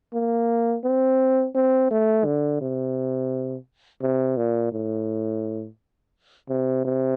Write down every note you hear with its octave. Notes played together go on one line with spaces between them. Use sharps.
A#3
C4
C4
A3
D3
C3
C3
A#2
A2
C3
C3